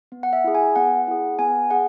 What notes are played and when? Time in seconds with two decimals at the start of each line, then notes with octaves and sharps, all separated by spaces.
0.12 B3
0.23 F#5
0.33 E5
0.44 E4 G#4
0.55 G#5
0.76 B3 F#5
1.08 E4 G#4
1.39 B3 G#5
1.71 G#4 F#5